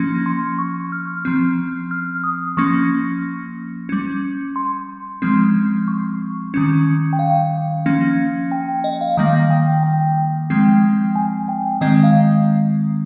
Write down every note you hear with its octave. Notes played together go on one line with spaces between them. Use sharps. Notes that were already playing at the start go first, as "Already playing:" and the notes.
Already playing: F3 A#3 C#4
C6
C#6
F6
F3 C4
F6
D#6
F3 A#3 C#4 C#6
G3 C#4
C6
F3 G#3 C4
C#6
D#3 G3 C#4
G5
F5
F3 A#3 C#4
G5
D#5
F5
D#3 G3 A#3 F5
G5
G5
F3 G#3 C4
G#5
G5
D#3 G#3 C4 D#5
F5